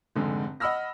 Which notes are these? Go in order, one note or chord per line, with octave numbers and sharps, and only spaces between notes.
F1 G#2 D3 G#3
D#5 F#5 B5 E6 F6 A#6